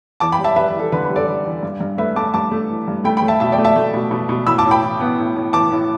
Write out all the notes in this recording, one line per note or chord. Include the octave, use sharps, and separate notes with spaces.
E2 A5 D6
G5 B5
G3
E5 A5
G3 B4 E5
B4
E2
A4
D3 B4
B4
G3
A4 D5
G3
E2
G2
G2
A3 B4 E5
A3 A5 D6
G2 A5 D6
A3
E3
G2
A3 G5 B5
G5 B5
A3
E5 A5
B2 E5 A5
D5 G5
A3
E5 A5
A3
B2
B2
B2
A2 B5 E6
A5 D6
A2
G5 B5
E3
B3
A2
A2
E3 A5 D6
A2